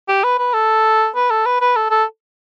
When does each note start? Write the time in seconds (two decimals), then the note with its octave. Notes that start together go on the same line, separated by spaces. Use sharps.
0.08 G4
0.24 B4
0.39 B4
0.54 A4
1.15 B4
1.30 A4
1.46 B4
1.61 B4
1.76 A4
1.90 A4